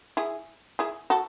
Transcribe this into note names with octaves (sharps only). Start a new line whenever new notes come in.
E4 G#4
E4 G#4
F#4 A4